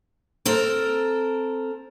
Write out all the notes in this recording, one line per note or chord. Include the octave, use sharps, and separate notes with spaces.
C4 A4 A#4